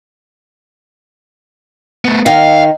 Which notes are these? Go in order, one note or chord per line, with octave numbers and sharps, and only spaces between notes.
A3 B3
D#3 F5